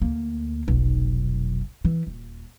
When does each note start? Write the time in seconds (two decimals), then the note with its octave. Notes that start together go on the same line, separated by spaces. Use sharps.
0.02 D2 A#3
0.67 F1 B1
1.85 E3
2.07 D#1